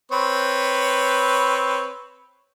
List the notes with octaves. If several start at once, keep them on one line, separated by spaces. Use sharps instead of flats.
C4 B4 C#5